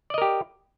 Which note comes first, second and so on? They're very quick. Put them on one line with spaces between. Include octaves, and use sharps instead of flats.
D5 D#5 A#4 G4